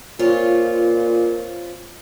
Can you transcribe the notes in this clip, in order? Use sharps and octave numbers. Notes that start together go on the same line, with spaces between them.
A#2 C4 F4 C#5